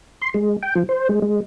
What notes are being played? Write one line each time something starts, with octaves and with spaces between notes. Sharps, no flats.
C6
G#3
G5
F3
C5
G#3
G#3